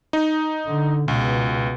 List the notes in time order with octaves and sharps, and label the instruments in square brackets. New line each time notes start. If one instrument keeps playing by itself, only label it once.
[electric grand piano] D#4
[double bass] D3
[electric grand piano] C#2 [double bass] B2